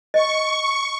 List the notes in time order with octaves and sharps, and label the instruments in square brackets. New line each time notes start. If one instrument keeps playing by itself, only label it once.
[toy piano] D#5 [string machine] C#6